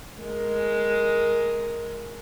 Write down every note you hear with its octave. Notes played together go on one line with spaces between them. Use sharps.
G#3 A#4